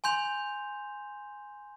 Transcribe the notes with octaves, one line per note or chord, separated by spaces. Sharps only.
G#5 C6 G6 F7